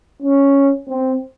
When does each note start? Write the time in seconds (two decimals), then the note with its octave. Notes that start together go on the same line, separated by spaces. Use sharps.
0.23 C#4
0.89 C4